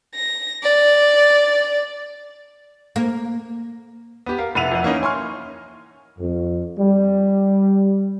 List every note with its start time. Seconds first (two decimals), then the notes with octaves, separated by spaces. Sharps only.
0.15 A#6
0.63 D5
2.96 A#3
4.26 B3 G4
4.38 A#4 F5
4.55 F1 E4 F#5 D#7 F7
4.71 F2 F#5
4.83 E3 A#3 C#4 D#4
5.02 C#5 G#5 C6 C#6 F6
6.19 F2
6.78 G3